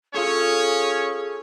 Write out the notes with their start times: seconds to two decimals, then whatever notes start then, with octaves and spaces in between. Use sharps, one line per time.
0.14 C#4 F4 G#4 A4 C#5